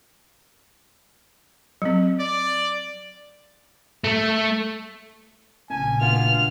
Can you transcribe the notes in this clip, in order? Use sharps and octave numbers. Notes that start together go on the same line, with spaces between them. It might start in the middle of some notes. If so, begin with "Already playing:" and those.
F#3 C4
D5
A3
A#1 A#2 C#3 C#4 G#5 A5
D2 B3 D4 F4 F6